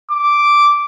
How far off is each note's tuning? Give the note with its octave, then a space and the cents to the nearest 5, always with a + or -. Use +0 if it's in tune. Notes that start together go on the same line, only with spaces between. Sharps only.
D6 -5